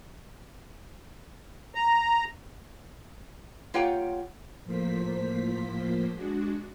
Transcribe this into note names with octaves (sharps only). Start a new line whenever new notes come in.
A#5
A#3 F4 G4 C#5 F#5 G5
A2 F3 A#3 C5 B6
G#3 D4 F#4